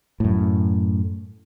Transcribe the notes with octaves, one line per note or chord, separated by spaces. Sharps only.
F#2 A2